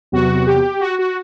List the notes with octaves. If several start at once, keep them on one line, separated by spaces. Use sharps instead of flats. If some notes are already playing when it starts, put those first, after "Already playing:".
E2 C3 F#3 B3 F#4
G4
F#4
F#4